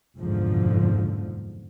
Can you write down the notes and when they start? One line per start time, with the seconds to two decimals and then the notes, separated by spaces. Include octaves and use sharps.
0.17 F#1 E2 G#2 B2 D3 F3